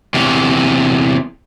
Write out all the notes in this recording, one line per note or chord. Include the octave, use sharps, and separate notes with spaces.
E2 C3